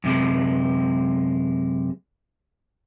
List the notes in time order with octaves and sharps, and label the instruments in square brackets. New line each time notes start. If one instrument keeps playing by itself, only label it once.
[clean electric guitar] F#2 C3 G#3